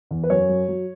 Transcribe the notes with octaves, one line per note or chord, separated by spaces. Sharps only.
E2
B4
F#2 C#5
F#3
F#3